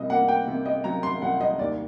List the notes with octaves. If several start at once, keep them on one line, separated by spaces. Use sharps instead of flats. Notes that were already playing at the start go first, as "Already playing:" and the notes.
Already playing: C2 D#5
A#3 F#5
G5
C3
D#5
F#3 A#5
C6
C2 F#5
D#5
D#2 D5